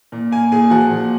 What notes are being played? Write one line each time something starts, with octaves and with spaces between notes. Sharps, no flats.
A#2
A#3 G#5
A#2 G#4 G#5
F3 F#4 F#5
A#2